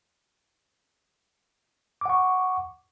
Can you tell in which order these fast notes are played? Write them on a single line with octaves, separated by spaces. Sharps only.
D6 F#5 C#6